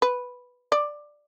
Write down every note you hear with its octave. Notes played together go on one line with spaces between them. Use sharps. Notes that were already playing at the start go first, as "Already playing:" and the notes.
B4
D5